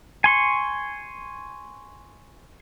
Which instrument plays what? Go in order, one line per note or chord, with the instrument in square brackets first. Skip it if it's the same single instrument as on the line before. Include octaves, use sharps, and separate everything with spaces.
[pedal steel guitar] G#5 C6 C#6